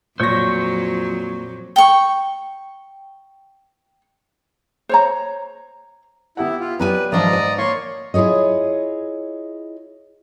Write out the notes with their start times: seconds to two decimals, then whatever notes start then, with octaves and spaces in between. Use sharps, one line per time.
0.20 F2 A#2 F#3 C5 C#5 C#6 A#6
1.76 G5 C#6
4.89 C5 C#5 A#5
6.37 B3 E4 G4 F#5
6.60 F4
6.79 F#3 B3 G4 B4 D5 G#5
7.12 G#2 E3 F3 D4 D5 D#5 A#5
7.33 G#5
7.58 A#3 C#5 C6 C#6
8.14 E4 F4 G#4 C#5 D#5